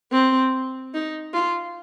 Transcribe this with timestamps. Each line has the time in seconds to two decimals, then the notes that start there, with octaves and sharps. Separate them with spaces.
0.12 C4
0.94 D#4
1.34 F4